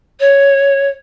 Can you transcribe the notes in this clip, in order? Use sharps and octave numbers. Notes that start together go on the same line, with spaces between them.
C#5